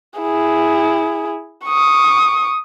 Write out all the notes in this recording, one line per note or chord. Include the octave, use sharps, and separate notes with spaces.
E4 G#4
C#6 D#6